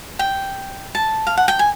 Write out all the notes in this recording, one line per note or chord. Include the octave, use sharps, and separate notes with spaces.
G5
A5
F5
F#5
G5
G#5